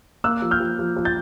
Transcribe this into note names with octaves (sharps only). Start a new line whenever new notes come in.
A#3 E6 F#6
F3
F6 G6
F3
F3
F3
G6 A6